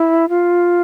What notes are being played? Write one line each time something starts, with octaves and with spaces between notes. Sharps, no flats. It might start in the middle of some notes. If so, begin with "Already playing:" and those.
Already playing: E4
F4